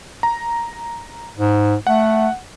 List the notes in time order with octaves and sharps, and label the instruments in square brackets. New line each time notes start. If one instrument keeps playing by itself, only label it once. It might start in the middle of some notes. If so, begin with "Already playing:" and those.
[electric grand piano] A#5
[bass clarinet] G#2
[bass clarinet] A3 [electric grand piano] F#5